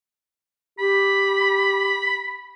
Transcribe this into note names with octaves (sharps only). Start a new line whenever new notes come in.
G4 B5